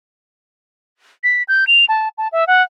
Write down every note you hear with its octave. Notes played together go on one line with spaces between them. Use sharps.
B6
G6
F7
A5
A5
E5
F#5